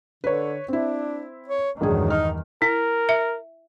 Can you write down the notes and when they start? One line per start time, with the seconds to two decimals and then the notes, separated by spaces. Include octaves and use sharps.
0.24 D3 B4 C#5
0.68 C4 D4 E4
1.48 C#5
1.81 A#1 E2 G2 D#3 F#3 G#3 G#4
2.10 D#4 F6
2.62 E4 A#4
3.09 E5